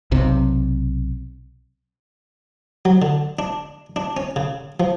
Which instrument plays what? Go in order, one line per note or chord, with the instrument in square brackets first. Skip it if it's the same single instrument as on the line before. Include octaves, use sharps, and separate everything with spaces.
[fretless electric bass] B1 C3
[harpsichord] F#3
D3
D4
D4
C#4
C#3
F3